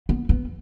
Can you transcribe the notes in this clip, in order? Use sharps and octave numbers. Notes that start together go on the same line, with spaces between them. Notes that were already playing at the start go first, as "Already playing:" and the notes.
B3
B3